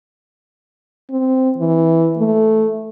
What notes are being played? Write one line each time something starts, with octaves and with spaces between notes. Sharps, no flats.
C4
E3
A3